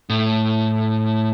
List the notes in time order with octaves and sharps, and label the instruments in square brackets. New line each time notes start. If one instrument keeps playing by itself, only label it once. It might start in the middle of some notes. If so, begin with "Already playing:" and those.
[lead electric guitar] A2